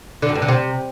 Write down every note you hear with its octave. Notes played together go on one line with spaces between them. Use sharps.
D3
F#2
G2
D3
C3